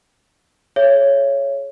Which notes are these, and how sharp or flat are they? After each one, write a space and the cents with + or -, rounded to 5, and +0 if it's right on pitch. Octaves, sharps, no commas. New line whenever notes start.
G#4 +40 C#5 +0 E5 +40